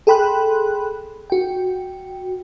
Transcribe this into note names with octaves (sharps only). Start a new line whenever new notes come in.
G#4 A4 G5 B5 C6 F#6
F#4 G5